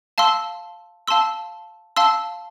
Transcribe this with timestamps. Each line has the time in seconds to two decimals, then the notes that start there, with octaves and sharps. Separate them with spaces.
0.18 F5 A5 C6 E6
1.08 F5 A5 C6 E6
1.96 F5 A5 C6 E6